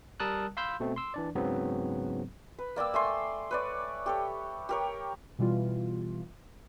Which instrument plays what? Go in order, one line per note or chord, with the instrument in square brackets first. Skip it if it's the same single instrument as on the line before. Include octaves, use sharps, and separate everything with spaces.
[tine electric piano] G3 A#4 A5 D#6 E6 F#6
F5 B5 C6 E6 G6
B2 A3 C4
C6 E6
E3 D4 D5
G#2 C#3 F#3 B3 C4
[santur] B4
A#3 D5 G5 E6
A3 G#5 C6
B4 C#5 D5
G4 A4 C#5
G4 A#4 C#5
[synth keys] B2 E3 G3 F4